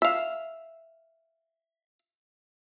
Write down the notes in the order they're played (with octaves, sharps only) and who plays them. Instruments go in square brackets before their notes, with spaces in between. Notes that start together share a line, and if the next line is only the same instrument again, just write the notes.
[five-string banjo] E5 F5